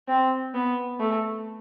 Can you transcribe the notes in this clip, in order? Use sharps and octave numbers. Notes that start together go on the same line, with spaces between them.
C4
B3
A3